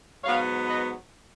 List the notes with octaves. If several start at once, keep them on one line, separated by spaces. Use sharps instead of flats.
G#2 F#3 B3 C#5 F5
B4 D#5